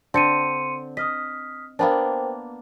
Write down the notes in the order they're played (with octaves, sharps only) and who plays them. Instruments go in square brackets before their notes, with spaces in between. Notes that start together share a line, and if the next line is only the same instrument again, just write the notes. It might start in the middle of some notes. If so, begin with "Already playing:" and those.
[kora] D3 C4 [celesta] C6 C#7 D#7
[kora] D#5 [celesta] D#6 F6 B6
[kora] A#3 B3 D4 [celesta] A#4 C5 G5